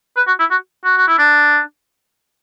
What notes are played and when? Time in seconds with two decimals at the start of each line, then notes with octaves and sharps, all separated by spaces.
0.17 B4
0.27 F#4
0.40 E4
0.51 F#4
0.85 F#4
0.97 F#4
1.08 E4
1.18 D4